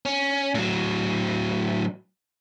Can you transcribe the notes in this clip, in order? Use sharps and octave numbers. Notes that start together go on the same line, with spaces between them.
C#4
A2 F#3